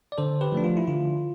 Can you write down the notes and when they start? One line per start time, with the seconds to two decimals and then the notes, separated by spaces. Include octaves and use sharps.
0.12 D5
0.18 D3 A4 C5
0.41 G4 B4
0.52 F3 A3 D4
0.64 F4
0.77 E4
0.87 D3 F4